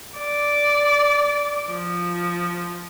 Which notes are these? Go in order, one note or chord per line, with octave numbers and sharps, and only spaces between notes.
D5
F3